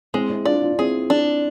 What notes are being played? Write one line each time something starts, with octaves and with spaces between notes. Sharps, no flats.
G#3 C4 E4
C4 E4
D4 F4 D5
D4 F4
D4
C4 E4 G#4
D4